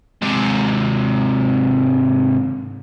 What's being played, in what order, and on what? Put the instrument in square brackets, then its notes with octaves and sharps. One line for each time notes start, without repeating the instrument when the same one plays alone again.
[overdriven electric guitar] G#2 C3